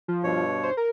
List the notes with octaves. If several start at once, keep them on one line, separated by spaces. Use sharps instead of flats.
F3
G2 B2 C#5
C5
A#4